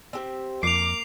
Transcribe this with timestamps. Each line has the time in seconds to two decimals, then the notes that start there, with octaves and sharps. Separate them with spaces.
0.13 C4 G4 E5
0.63 F2 A#3 D6 C7 F7